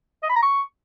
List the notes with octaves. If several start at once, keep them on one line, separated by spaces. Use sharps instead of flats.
D#5
B5
A#5
C#6